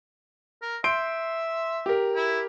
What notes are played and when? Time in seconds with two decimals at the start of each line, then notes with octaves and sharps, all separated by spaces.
0.62 A#4
0.84 E5 C6 G6 D7
1.86 G4 A#4
2.16 E4